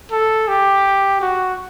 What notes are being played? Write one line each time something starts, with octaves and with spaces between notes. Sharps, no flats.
A4
G4
F#4